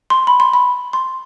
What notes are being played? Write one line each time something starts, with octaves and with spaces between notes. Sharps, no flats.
C6
B5
C6
B5
C6